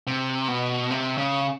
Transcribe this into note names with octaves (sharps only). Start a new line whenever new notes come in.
C3
B2
C3
C#3